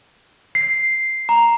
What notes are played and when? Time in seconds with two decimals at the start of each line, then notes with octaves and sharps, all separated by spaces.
0.55 C7
1.29 A#5